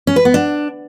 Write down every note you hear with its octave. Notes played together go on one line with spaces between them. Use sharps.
C#4
B4
B3
D4